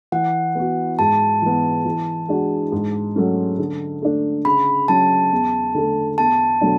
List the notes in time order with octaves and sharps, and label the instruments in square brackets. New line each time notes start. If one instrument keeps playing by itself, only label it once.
[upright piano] E3 [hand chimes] F#5
[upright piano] B3 F#4
[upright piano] G#2 [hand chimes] A5
[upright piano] E3 B3
E3
G#3 D4 F#4
G#2
F#3 A3 C#4
D3
A3 D4
[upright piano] C#3 [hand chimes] B5
[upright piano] F#3 C#4 [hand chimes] A5
[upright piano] E2
D3 A3
[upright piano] E2 [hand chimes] A5
[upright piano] B2 F#3 A3 D4